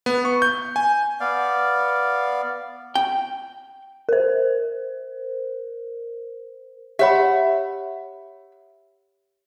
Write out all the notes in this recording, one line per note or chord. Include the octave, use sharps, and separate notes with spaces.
B3
C#6
G6
G#5
B3 D5 F5
G5
A#4 C5
G4 C#5 E5 F#5 B5